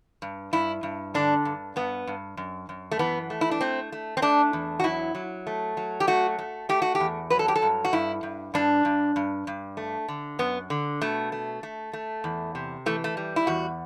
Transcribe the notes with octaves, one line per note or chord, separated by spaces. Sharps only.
G2
G2 E4
G2
D3 D4
G2
G2 B3
G2
F#2
F#2
A3
E3 B3
A3
E4
D4
A3 C4
A3
C4
A3 D4
E2
F#4
F#3 E4
F#3
A3
F#3
G4
A3 F#4
A3
A3 G4
F#4
G4
E2
F#3 B4
A4
G4
A4
G2
F#4
G2 E4
G2
G2 D4
G2
G2
G2
A3
D3
F#2 B3
D3
B2 A3
A3
A3
A3
E2
C3
E3 A3
A3
G3
E4
E2 F#4